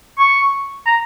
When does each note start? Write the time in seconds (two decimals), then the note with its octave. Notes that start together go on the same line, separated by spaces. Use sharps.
0.18 C#6
0.86 A#5